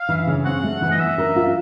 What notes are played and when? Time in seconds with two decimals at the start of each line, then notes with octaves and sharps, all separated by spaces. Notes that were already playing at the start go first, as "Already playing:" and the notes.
Already playing: F5
0.09 E3
0.27 C#3
0.45 C4 F#5
0.63 A3
0.82 E3
0.91 D#5
1.00 B3 E5
1.18 A#4
1.36 F4